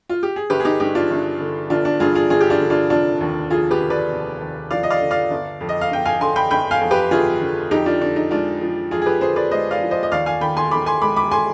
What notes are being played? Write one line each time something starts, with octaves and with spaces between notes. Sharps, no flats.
F4
G4
G#4
G1 G4 B4
G#4
D#4 G4
G2 D#4 G4
D4 F4
G1
D3
G1 D4 F4
D4
G2 F4 G#4
F4 G#4
G1 F4 G#4
G4
D4 F4
D3
D4 F4
F1 D4 F4
D#2
F3 F4 G#4
G4 B4
D3
B4 D5
F1
D#2
F3 D5 F5
D#5
D5 F5
D3
D5 F5
G1
F2
D#5
F5
G1 G5
F5 G#5
D3 G#5 C6
G5 B5
G1 G5 B5
F5 G#5
F2
G4 B4
G1 F4 G#4
D3
F2 D#4 G4
D4 F4
D3 D4
D#4
G#3 D4 F4
F3
F2 F4 G#4
G#4
G4 B4
D3 G#4 C5
B4 D5
G#3 C5 D#5
D5 F5
F3
C5 D#5
D#5
D#2 D5 F5
F5 G#5
D#3 G5 B5
G#5 C6
D#2 B5 D6
G#5 C6
G#3 B5 D6
B5 D6
G#5 C6